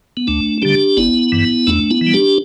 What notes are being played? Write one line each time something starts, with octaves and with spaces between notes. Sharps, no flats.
B3
D2 A3 D4
D3 G3 D4 G4
G1 B3 E4
G2 E3
E2 A3 D4
B3 E4
E3
G3
D4 G4